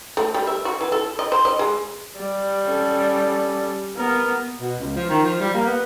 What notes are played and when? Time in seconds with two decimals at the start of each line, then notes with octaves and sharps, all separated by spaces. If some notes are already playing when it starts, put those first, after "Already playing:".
0.17 A3
0.34 G3
0.47 E5
0.65 F#4
0.81 E3
0.92 A4
1.19 D#5
1.32 C5
1.45 D#5
1.59 G#3
2.20 G3
2.64 C#4 A4
3.96 B3 A#4
4.60 B2
4.78 C#2
4.96 F3
5.09 D#3
5.23 F3
5.41 G3
5.54 A#3
5.66 B3